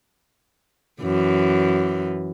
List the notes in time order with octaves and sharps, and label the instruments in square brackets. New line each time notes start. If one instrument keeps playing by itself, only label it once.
[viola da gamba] F#2 E3